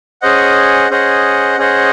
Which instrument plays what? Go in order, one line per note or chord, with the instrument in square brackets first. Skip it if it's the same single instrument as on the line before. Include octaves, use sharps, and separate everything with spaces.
[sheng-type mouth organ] C#4 G#4 C5 D#5 F#5
C#4 G#4 C5 D#5 F#5
C#4 G#4 C5 D#5 F#5